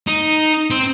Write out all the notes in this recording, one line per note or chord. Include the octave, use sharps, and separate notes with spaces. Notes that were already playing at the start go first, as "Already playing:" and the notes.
D#4
C4